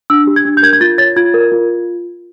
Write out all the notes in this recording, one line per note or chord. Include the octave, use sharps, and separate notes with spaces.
D4 E6
G4
G#6
D4
G6
A#4 G#6
G#6
F4 A6
C#5 A6
F4 G#6
A#4
F4